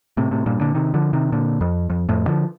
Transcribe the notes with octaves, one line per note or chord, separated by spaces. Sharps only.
A2 C3
A2 C3
G2 A#2
A#2 D3
C3 D#3
D3 F3
C3 D#3
A#2 D3
F2
F2
F2 A2
D3 F3